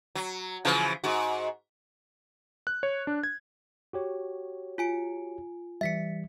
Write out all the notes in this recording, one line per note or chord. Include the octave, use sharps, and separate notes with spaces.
F#3
C#3 E3 F3
G#2 F#4
F#6
C#5
D4
G#6
F#4 G4 C#5
F4 G#5 D7
E3 G3 E5 B6 C#7